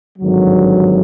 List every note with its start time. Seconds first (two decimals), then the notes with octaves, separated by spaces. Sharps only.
0.19 G#1 G2 D3 F#3